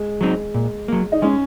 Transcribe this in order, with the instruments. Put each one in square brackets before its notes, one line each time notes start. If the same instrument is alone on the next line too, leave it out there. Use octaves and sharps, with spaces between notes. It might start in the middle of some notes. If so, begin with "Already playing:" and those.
Already playing: [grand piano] G#3
[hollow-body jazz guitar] F#3 C4 D#4
A#2
F#3 A#3
[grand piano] D#4
[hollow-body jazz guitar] G#3 [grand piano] C#4